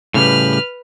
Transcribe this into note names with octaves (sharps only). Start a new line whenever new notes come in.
A2 C#3 G3 B4 F6